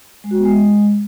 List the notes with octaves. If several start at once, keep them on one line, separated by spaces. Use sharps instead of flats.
G#3
F#4
B3
G#3